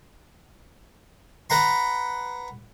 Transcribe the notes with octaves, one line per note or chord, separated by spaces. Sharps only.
B4 F#5 A#5 C6